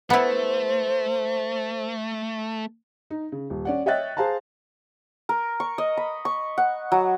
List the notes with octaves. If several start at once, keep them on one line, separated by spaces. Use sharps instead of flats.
A3 B3 E4 C5
D#4
C#3
D#1
C#4 D5 F#5
C#5 D#5 E5 G5 F#6 A6
G#4 C5 F5 A5 A#5
A#4
C#6
D#5
B5
C#6
F#5
F#3